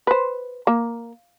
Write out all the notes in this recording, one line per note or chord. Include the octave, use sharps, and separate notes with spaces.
B4 C5
A#3